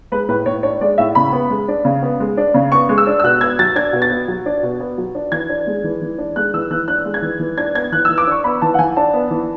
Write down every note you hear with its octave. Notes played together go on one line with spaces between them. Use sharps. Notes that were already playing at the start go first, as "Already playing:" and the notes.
G#3 B4
A2 B4
A2 C#5
D4 C#5
G#3 D5
A2 E5
C#3 B5
B3
G#3
D4
C#3
B3
G#3
D4
C#3
B3 C#6
G#3
E6
D4
E6
B2 F#6
B3 G#6
F#3 A6
D4 G#6
B2
A6
B3
F#3
D4
B2
B3
F#3
D4
E3 G#6
D4
G#3
E3
E3
D4
G#3 F#6
E3 E6
E3 F#6
D4 F#6
G#3
G#6
E3
E3
D4 G#6
B3 G#6
E3 F#6
E6
E3
D6
D4 C#6
B3 B5
E3 A5
F#5
E3 G#5
D4 A5
B3
E3